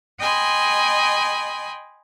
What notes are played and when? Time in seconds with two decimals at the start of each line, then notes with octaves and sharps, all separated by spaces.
0.19 D#5 G5 G#5 B5 C6